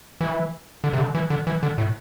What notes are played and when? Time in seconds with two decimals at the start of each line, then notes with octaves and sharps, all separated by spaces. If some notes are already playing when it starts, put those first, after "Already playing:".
0.21 E3
0.84 D3
0.93 C3
0.99 D3
1.15 E3
1.30 D3
1.47 E3
1.63 D3
1.78 A2